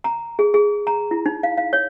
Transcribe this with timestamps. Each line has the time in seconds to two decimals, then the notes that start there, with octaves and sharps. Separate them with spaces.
0.04 A#5
0.39 G#4
0.54 G#4
0.87 A#5
1.11 E4
1.26 D#4
1.43 F5
1.58 F5
1.73 C#5